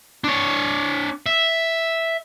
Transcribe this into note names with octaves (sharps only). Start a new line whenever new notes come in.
D4 C#5
E5